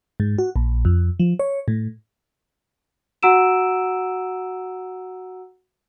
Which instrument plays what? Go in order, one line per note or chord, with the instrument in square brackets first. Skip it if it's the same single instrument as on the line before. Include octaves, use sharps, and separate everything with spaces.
[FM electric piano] G#2
F#4
A#1
F2
F3
C#5
A2
[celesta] F#4 F#5 A#5 E6 D7 E7